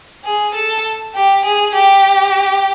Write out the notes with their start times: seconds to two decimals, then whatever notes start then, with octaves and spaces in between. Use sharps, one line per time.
0.25 G#4
0.55 A4
1.15 G4
1.45 G#4
1.75 G4